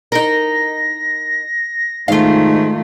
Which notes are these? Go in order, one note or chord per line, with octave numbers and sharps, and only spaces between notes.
D#4 A#4 A#6
G#2 D#3 A3 F4 F5